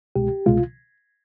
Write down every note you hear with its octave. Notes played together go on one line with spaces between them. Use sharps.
C2 B2 G#3 G4
C2 B2 G#3 F4